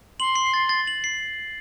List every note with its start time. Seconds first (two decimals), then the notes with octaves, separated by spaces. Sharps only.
0.20 C6 F#7
0.36 C7
0.54 A6
0.69 A6
0.87 F#7
1.04 C7